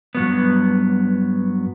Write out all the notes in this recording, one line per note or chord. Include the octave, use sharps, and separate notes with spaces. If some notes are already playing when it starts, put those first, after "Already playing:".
G2 F#3 B3